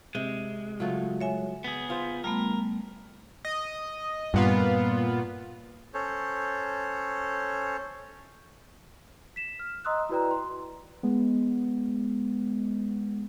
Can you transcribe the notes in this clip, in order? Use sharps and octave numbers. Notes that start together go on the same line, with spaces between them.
C3 G#3
C#3 F#3 A3 F4
C#5 E5 G#5
B3 G#4
F4 C5
G3 A3 B3 A#4
D#5
G2 A#2 B3 F4
C#4 A4 C5 C#5
B6 E7
F6
D#5 A#5 C6 D#6 E6 F#6
E4 F#4 B4 D5 G5 A#5
C6
G#3 B3